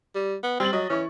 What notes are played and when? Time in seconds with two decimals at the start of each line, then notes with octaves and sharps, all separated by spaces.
0.15 G3
0.43 B3
0.60 G3 C4 A6 F#7
0.73 F#3 D#5
0.90 E3 C#4 C#6